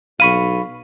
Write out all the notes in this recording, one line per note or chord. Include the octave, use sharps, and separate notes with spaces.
B1 F5 B5 C#6 D#7